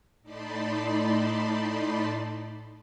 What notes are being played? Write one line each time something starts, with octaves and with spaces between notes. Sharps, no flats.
A2 D#4 D5 A5 B5 C6